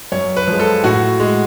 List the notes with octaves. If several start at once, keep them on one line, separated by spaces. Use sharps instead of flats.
F#2 C#5
B4
F3
G#3
A4
A2 F#4
G#3